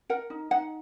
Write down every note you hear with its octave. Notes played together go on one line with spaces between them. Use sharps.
A#4 F#5
D#4
D#4 F#5